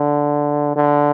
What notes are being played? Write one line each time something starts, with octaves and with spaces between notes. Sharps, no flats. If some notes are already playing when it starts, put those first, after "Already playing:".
Already playing: D3
D3